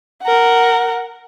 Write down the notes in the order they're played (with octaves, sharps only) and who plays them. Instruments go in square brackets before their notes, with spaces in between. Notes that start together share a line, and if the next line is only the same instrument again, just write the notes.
[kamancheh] A#4 F#5